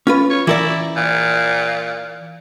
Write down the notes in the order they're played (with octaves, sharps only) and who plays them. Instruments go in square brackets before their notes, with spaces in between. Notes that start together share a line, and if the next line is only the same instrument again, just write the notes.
[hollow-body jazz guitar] C#4 F4 B4
[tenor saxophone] C#5
[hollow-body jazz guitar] E3 A#4 D5 [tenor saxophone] E4
[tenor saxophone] A#2